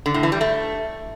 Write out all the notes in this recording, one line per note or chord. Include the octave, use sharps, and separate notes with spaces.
D3
A2
E3
G3
A3